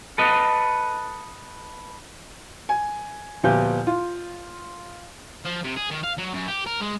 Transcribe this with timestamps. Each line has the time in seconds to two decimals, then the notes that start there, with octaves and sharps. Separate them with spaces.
0.18 A4 B4 D#5
2.69 G#5
3.43 D2 A#2 F3 B3 G4 G6
3.87 F4
5.45 F3
5.64 C3
5.77 G#4
5.91 D#3
6.03 F5
6.18 F#3
6.33 F#2
6.48 G4
6.67 A#4
6.82 G#3